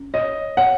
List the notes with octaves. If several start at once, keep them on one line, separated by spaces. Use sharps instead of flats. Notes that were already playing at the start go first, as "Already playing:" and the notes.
Already playing: C#4
C#5 D#5
C#5 F#5